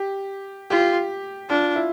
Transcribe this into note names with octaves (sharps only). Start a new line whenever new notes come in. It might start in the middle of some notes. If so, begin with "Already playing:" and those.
Already playing: G4
F4 G4
D4 F4
E4